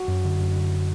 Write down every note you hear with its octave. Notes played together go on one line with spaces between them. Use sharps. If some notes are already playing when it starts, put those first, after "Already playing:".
Already playing: F#4
F#2
D3
F#2
D3